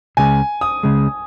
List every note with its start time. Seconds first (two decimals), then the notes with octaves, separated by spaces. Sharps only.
0.17 C#2 C#3 G#3 G#5
0.61 D#6
0.83 C#2 C#3 G#3